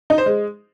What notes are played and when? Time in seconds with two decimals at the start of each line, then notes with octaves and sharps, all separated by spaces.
0.10 D#4
0.18 C5
0.26 G#3